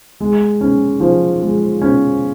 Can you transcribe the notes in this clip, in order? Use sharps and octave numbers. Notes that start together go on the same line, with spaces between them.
G#3
C#4
F3
G#3
C#4